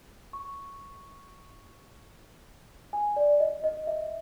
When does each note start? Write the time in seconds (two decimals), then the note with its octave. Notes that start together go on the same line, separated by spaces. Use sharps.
0.33 C#6
2.93 G#5
3.16 D5
3.40 D#5
3.64 D#5
3.87 E5